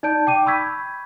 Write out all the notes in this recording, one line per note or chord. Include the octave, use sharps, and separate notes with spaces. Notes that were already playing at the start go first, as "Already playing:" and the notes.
D#4 D5 A5 G6 D7
G5 D6 D#7
B5 C#6 E6 G6 G#6 B6